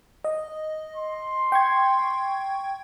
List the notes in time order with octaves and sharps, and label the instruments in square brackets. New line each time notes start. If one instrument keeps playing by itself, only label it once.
[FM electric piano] D#5
[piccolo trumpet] C6
[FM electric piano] G5 C#6 G#6